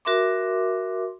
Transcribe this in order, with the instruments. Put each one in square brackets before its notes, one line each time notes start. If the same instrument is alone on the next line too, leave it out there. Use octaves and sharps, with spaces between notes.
[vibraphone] F#4 A#4 E5 C6 D6